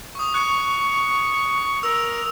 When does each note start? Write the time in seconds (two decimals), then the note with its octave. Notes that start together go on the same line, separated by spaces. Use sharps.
0.15 C#6 D#6
0.34 C#6 F#6
1.83 A#4 E6 F7